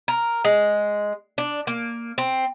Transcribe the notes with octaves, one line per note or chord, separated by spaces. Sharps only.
A#4
G#3
D4
A#3
C4